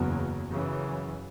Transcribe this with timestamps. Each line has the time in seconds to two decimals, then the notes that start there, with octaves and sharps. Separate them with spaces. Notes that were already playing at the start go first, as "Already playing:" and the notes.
Already playing: F#1 E2 C#3 F#3
0.49 F#2 C#3 E3